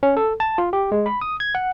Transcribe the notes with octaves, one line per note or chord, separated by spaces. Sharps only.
C#4
A4
A5
F4
G4
G#3
B5
D#6
G#6
F#5